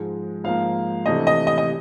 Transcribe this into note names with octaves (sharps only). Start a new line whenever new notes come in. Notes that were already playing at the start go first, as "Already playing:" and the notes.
Already playing: G#2 F3 G#3
G#2 F3 A#3 F5
C3 E3 A3 D4 D#5
D#5
D#5
D#5